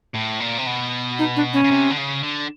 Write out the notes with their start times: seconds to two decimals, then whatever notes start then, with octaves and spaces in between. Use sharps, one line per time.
0.15 A2
0.40 A#2
0.58 C3
0.66 B2
1.19 D#4
1.36 D4
1.53 C#4
1.64 C#3
1.71 C3
1.90 D3
1.97 C#3
2.23 D3